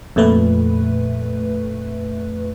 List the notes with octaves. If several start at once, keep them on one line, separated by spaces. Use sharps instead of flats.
F2 A#2 A3 B4